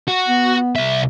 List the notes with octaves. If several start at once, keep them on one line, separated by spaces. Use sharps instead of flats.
F#4
B3
C2 E5